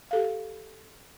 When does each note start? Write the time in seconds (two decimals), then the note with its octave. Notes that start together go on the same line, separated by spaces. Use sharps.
0.11 G4 A4 F5